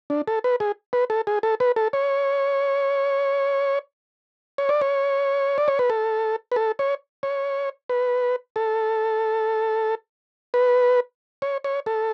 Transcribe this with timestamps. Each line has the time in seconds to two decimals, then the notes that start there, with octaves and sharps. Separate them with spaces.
0.10 D4
0.28 A4
0.44 B4
0.60 G#4
0.93 B4
1.10 A4
1.27 G#4
1.43 A4
1.60 B4
1.76 A4
1.93 C#5
4.58 C#5
4.69 D5
4.81 C#5
5.58 D5
5.68 C#5
5.79 B4
5.90 A4
6.52 B4
6.56 A4
6.79 C#5
7.23 C#5
7.90 B4
8.56 A4
10.54 B4
11.42 C#5
11.64 C#5
11.86 A4